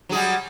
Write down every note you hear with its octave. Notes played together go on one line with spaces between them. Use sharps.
F#3 G3 G#4